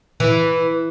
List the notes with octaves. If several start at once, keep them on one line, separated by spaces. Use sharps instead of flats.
E3